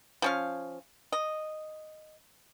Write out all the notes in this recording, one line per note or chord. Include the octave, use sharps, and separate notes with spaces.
F3 C#4 F5
D#5